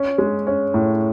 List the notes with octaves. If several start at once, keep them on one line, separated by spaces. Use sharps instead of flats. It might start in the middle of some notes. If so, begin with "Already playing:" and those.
Already playing: C#4
G#3
C#4
A2